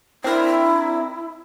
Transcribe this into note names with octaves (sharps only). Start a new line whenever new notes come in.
C4 D4 E4 A#4